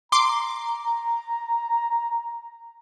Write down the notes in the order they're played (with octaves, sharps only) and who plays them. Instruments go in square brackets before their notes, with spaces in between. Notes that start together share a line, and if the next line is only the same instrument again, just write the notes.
[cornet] A#5 [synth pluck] C6 D6